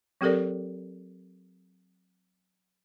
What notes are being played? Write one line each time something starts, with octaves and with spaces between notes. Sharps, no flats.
F#3 C4 G4 A4 A#4 D5